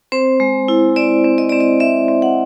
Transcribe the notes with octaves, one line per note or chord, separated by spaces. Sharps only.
C4 C5
G#3
E4
C4 D5
C4
D#5
C4 D5
D#5
C4 E5
C4
F#5